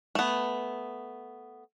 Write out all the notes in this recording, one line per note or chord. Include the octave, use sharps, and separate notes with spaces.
A3 B3